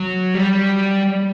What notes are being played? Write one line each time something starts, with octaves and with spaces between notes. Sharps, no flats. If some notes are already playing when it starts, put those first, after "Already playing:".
Already playing: F#3
G3